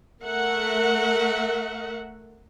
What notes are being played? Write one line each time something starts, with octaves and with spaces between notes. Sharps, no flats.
A3 A#4 E5 F#5